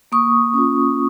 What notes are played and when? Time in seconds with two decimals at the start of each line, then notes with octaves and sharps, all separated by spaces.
0.12 A#3 C#6 D#6
0.54 C#4 F4